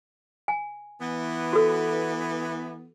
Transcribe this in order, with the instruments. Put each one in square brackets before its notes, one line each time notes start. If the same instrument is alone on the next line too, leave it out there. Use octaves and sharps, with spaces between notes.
[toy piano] G#5
[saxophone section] E3 B3
[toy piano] F#4 A4